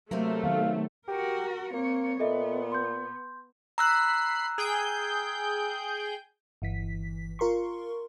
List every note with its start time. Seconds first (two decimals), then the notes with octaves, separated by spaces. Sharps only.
0.11 C3 F#3 A3 A#3 A#4
0.44 D#3 F#3 B3 F5
1.08 F#4 G4 A#4
1.73 A#3 C4 C#5
2.20 A#2 B3 A4 D#5 E5
2.72 C6 G6
3.78 A#5 B5 E6 F#6 C7
4.58 G#4 G5 G6
6.62 G1 E3 B6
7.39 F4 A#4 C6 C#6